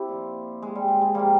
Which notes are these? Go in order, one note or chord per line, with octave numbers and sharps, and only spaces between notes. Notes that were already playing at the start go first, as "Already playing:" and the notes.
Already playing: C4 E4 G4
A#2 F3
G#3
G3
G#3
G#3
F3 G3 A#3